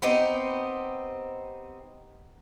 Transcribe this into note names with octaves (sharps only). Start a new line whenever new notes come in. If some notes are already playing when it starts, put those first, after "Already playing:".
B3 C4 D#4 G4